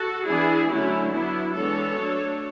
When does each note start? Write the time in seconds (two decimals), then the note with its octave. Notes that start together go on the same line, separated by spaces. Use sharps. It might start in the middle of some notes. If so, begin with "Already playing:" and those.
Already playing: F#4 A4
0.27 E3 B3 D4 E4 G#4
0.69 D3 F#3 A3 C#4 E4
1.12 F#3 B3 D4 E4
1.55 E3 G#3 B3 D4 A4 C#5
1.98 F#3 A3 D4